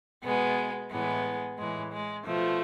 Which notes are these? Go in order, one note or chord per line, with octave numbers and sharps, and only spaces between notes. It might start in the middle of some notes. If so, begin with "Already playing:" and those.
B2 G#3 B3
A2 E3 G#3 B3
A2 E3 G#3
G#3
B2 F3 A3